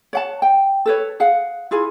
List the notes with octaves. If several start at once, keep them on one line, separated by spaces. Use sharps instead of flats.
C#5 F#5 A5
G5
A4 B4 C#5
G#4 F5 F#5
E4 F4 G#4